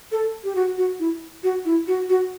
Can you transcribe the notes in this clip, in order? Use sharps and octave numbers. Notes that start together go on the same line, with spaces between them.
A4
G4
F#4
F#4
E4
F#4
E4
F#4
F#4